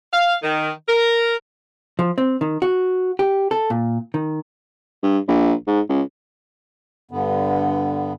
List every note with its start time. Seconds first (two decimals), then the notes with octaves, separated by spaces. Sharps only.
0.13 F5
0.43 D#3
0.88 A#4
1.99 F3
2.18 C4
2.41 D#3
2.62 F#4
3.19 G4
3.51 A4
3.70 A#2
4.14 D#3
5.03 G2
5.28 A#1
5.67 G#2
5.89 C#2
7.11 G2 D3 B3